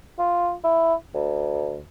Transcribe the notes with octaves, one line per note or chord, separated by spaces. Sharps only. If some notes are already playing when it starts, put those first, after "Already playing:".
F4
E4
D2